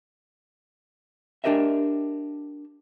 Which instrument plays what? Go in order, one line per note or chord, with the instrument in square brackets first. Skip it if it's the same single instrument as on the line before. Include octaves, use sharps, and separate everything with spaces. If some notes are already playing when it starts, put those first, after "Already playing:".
[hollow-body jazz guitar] D4 G4 A#4 D#5 E5